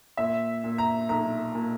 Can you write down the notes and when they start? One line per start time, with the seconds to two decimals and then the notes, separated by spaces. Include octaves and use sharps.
0.17 A#2 E5
0.64 A#2
0.78 A#5
1.09 B1 A#5
1.55 A#2